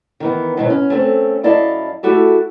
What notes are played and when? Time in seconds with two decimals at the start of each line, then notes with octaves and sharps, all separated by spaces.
0.20 D#3 E3 B3
0.57 G#2 B2 D#3 F#3 B3 E4
0.70 C#4
0.90 A3 C4 C#4
1.43 F#2 E4 D5 D#5 F5 A5
2.03 A3 E4 F#4 G4 A4